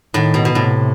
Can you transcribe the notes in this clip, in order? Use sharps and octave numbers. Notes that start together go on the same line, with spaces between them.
A2 D#3
B2
B2
A2 C3